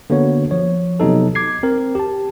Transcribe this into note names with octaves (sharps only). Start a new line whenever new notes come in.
D3 A#3 B3 F#4 C#5
F3 C#5
C3 F#3 B3 D#4 A4
D6 G#6 C7
C4 A#4
G4 A5